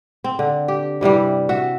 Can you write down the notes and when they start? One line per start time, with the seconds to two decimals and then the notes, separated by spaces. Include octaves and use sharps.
0.24 C4
0.39 D3
0.68 G4
1.01 G2 C3 E3 G3
1.49 F#4 E5